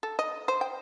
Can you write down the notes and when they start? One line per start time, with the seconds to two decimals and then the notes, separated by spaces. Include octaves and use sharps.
0.03 A4
0.19 D#5
0.48 C5
0.61 G5